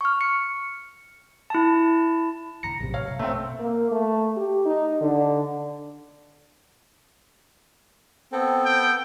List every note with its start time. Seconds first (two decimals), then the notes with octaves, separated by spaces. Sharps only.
0.01 C#6 F6
0.21 C#7
1.50 E4 A5
2.63 B2 D3 A#5 A#6 C#7
2.80 A#1 F#2 A2 C3
2.94 C#5 F5
3.07 G2 B2
3.19 B2 A3 C4 A#5
3.59 A#3
3.91 A3
4.36 G4
4.65 D#4
5.01 D3
8.32 B3 C4 A4
8.65 G5